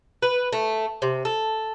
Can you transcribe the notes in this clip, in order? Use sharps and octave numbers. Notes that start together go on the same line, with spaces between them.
B4
A3
C3
A4